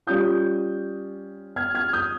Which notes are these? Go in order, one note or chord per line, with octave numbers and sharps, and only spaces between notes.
G3 C#4 F4 D#6 G6
F6 G#6
F6 G#6
D#6 G6